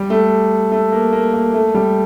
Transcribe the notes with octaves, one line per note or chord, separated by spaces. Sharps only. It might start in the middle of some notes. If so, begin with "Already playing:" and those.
Already playing: G3
A3
A3
A#3
A#3
A#3
A3
G3